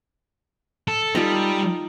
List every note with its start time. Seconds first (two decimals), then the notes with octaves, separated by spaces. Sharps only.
0.88 A4
1.15 G3 D#4 F4 A4